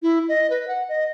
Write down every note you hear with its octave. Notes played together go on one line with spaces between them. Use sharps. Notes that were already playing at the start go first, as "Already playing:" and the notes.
E4
D#5
B4
F#5
D#5